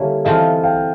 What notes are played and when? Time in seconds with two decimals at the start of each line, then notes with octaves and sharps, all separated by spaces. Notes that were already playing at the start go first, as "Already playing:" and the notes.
Already playing: D3 G3 A#3 C#4 E4
0.25 E3 A3 C4 F4 D#5 F5
0.64 F5 G5